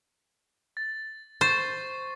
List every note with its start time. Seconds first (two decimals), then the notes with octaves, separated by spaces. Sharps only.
0.77 A6
1.41 C5 C#6 A6 C7